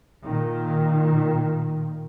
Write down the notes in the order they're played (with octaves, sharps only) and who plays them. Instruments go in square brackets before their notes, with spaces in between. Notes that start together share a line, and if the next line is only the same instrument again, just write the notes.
[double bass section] A#2 D#3